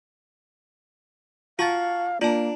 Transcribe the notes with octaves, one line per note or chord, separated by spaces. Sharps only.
F4 F#4 F5 A5 A6
A#3 D4 F4 A5